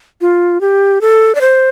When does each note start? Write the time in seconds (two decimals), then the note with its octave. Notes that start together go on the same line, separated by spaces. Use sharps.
0.21 F4
0.61 G4
1.01 A4
1.35 D5
1.41 C5